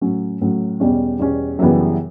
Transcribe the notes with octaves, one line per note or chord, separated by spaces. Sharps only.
A2 F#3 C#4
A2 F#3 C#4
E2 B2 G3 C#4
E2 B2 G3 C#4
F#2 C#3 E3 G3 B3